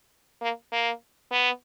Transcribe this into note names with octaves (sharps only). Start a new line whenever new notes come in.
A#3
A#3
B3